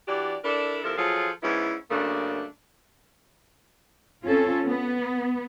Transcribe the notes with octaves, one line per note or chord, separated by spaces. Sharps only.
E3 D4 F#4 G4 D5
D4 E4 A4 A#4 D5
C3 F3 E4 A4 A#4
F3 F#3 F4 G#4 A4
G#2 B3 C#4 E4
F#2 C#3 A3 A#3 D4
C4 C#4 F4 A4
B3